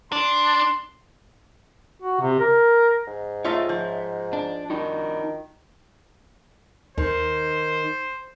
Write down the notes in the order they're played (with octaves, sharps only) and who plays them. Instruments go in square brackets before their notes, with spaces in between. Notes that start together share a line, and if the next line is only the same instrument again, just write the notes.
[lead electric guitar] D4 [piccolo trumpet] C6
[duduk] F#4
C3
A#4
[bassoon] G#2
[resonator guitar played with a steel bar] A3 D#4 F4 [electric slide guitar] C#5 E5
[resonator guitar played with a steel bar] F3
[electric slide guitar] D4
[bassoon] D#3 [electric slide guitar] D4 D#4 F#4
[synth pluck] D#2 [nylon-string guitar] D#3 [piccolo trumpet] C5